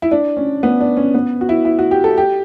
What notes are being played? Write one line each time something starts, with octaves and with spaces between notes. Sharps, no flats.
E4
D4
C#4
B3
D4
C#4
B3
F#4
E4
E4
F#4
G4
A4
G4